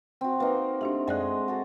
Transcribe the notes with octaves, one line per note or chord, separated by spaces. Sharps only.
C4 F#4
A#3 D#4 B4
A3 D4 F#4 G4
F#2 G#3 D5 D#5 F#5 F#6
F#4 A4